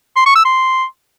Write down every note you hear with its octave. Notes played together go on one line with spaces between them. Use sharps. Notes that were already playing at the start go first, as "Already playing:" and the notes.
C6
C#6
E6
C6